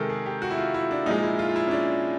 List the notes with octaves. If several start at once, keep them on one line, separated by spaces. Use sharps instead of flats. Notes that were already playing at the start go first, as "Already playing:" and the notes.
Already playing: C3 D#3 G#3 A4 A#4
G#4
G4
F#4
E4
F4
E4
D4
A#2 F3 G#3 D#4
E4
F4
F4
E4
C#4
D4